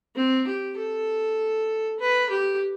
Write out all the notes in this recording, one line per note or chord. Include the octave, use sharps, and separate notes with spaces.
C4
G4
A4
B4
G4